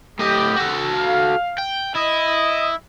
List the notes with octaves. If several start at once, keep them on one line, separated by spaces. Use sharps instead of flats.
A2 G4 D#5
F#4 A4
F5
G5
E4 D#5